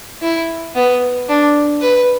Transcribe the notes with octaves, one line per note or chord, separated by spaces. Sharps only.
E4
B3
D4
B4